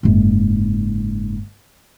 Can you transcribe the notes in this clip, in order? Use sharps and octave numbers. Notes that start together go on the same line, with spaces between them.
F#1 G#2